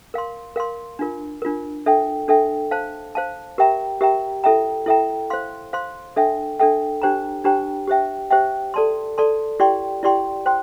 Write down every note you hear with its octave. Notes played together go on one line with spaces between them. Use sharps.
A#4 F5 C6
A#4 F5 C6
D4 F4 A#4
D4 F4 A#4
D4 A4 E5 G5
D4 A4 E5 G5
C5 F5 A5
C5 F5 A5
G4 A#4 E5 G5 A#5
G4 A#4 E5 G5 A#5
E4 A4 E5 G5 A#5
E4 A4 E5 G5 A#5
C5 F5 C6
C5 F5 C6
D4 A4 E5 G5
D4 A4 E5 G5
D4 G4 C5 G5 A#5
D4 G4 C5 G5 A#5
G4 C5 E5 G5
G4 C5 E5 G5
A4 D5 A5 C6
A4 D5 A5 C6
E4 G4 D5 G5 C6
E4 G4 D5 G5 C6
C5 G5 C6